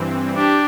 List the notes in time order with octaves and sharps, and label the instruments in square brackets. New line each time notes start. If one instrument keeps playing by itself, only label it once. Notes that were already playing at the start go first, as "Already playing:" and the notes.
Already playing: [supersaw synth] G2 E3 C4
[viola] D4 [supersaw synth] G4